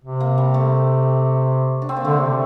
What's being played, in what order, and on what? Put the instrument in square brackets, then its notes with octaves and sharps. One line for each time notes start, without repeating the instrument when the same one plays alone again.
[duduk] C3
[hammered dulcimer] A#3
G3
A3
D4
C4
A#3
[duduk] D3 [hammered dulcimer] A3
[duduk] C3